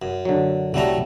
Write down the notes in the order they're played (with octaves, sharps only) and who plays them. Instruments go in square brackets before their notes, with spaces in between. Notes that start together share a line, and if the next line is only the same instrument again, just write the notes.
[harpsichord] F#2
[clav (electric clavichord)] D3 F#3
[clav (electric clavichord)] C2 G3 [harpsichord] F#3 A3 A#5